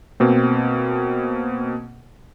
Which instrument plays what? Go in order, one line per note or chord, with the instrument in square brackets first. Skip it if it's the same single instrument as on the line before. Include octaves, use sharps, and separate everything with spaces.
[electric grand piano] B2 A#3 C4